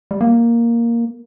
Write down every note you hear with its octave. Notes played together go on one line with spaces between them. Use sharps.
G3
A#3